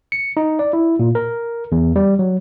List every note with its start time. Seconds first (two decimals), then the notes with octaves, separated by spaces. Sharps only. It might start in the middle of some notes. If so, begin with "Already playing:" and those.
0.12 C#7
0.37 D#4
0.59 D5
0.73 E4
0.99 A#2
1.15 A#4
1.72 E2
1.96 G3
2.19 F#3